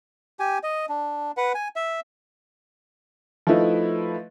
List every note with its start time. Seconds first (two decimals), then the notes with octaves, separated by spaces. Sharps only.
0.39 G4 G#5
0.63 D#5
0.89 D4
1.37 B4 F#5
1.54 G#5
1.76 E5
3.47 F3 A3 D#4 E4 B4